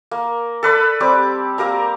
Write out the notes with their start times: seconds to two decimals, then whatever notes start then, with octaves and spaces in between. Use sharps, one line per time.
0.11 A#3
0.63 A4 B4 D5 B5
1.00 G3 C4 G4 D6
1.58 A#3 G4 A#4 A#5